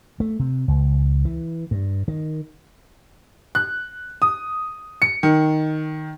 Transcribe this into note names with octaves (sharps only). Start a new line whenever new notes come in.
A3
C3
C#2
E3
G2
D#3
F#6
D#6
C#7
D#3